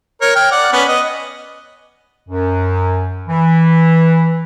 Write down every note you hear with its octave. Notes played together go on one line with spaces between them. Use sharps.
A#4 C#5
G5 F6
D5 F#5
B3 C#4 B4
D#5
F#2
E3